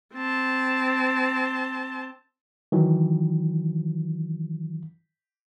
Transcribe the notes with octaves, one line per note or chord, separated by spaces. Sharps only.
C4 A5
D#3 E3 F#3